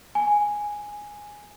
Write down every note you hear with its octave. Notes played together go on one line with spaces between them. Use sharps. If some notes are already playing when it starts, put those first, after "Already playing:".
G#5